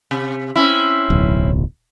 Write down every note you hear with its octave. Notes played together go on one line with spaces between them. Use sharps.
C3
C4 C#4 E4
D1 B1